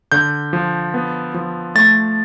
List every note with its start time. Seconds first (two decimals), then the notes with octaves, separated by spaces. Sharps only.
0.12 D3 G6
0.53 F3
0.94 B3
1.34 F3
1.75 A3 A6